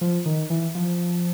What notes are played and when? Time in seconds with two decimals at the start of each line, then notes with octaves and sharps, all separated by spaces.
0.01 F3
0.26 D#3
0.50 E3
0.75 F3